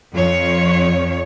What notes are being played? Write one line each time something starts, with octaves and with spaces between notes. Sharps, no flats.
F2 C#5